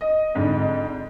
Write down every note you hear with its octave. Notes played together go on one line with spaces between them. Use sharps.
D#5
F2 G#2 D3